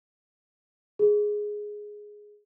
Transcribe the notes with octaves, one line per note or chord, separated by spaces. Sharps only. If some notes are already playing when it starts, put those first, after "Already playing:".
G#4